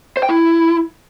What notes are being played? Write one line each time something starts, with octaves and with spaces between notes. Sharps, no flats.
C5
G5
E4